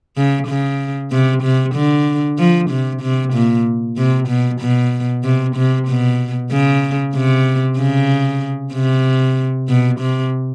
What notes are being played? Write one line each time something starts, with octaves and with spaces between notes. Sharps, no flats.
C#3
C#3
C3
C3
D3
F3
C3
C3
A#2
C3
B2
B2
C3
C3
B2
C#3
C3
C#3
C3
B2
C3